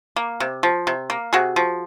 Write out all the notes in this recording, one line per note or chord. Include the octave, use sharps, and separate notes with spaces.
A#3
C3
F3
C3
A#3
C3 F#4 G#4
F3